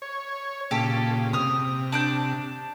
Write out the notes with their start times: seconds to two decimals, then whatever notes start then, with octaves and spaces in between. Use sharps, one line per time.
0.02 C#5
0.71 A#2 C#3 G4 A4
1.33 C3 D#6 F6
1.92 D4 D6 G6